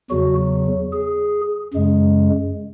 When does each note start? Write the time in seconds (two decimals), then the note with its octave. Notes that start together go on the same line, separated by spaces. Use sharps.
0.10 E2 C#3 F#3 F#4
0.93 G#4
1.74 F#2 C#3 G#3